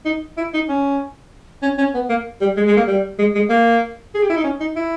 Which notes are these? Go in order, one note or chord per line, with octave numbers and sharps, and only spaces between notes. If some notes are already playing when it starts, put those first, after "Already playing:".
D#4
E4
D#4
C#4
C#4
C#4
B3
A#3
G3
G#3
G#3
A#3
G3
G#3
G#3
A#3
G#4
G4
E4
D#4
C#4
D#4
E4